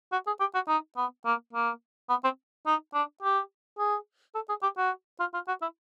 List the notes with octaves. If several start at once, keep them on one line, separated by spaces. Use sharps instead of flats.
F#4
G#4
G4
F#4
D#4
B3
A#3
A#3
B3
C4
D#4
D4
G4
G#4
A4
G#4
G4
F#4
F4
F4
F#4
E4